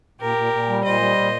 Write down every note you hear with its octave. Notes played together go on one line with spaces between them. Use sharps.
A#2 G4 A#4
A#2
A#2
G3
A#2 C5 D#5
G3
A#2